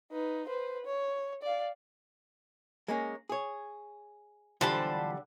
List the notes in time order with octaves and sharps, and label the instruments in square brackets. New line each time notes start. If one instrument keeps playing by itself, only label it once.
[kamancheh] D#4 B4
B4 C5
C#5
D5 F5
[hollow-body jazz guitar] G#3 A#3 C#4
G#4 C#5
[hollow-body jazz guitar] B1 E3 F4 [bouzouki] D3 G3 [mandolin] C5 A5 B5